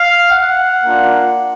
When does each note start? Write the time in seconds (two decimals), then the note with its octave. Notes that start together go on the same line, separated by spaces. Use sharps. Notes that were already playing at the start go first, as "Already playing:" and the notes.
Already playing: F5
0.32 F#5
0.84 A#3 D4 F4